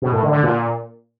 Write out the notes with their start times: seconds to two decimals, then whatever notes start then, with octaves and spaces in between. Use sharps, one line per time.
0.02 B2
0.12 A2
0.23 D3
0.33 D3
0.43 A#2